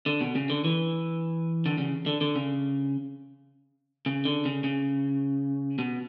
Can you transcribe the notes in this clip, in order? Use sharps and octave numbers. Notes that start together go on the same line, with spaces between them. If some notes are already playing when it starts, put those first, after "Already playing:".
D3
B2
C#3
D3
E3
D3
C#3
D3
D3
C#3
C#3
D3
C#3
C#3
B2